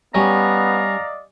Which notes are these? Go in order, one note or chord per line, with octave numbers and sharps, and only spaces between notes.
G3 B3 C#4 D5 D#5 F5 A#5